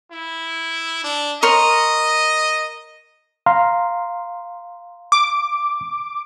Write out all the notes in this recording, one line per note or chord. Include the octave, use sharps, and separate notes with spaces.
E4
D4
A#4 C#5 D#5 C6
F5 A#5 C6
D6